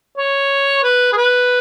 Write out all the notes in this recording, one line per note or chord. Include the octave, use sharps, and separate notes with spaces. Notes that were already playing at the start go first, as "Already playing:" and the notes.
C#5
B4
G#4
B4